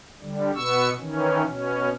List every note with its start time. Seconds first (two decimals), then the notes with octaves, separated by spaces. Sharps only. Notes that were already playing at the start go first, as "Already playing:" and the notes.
0.22 D3 G3
0.55 B2 B3 C#6 E6
0.99 D#3 E3 C#4
1.47 B2 C#4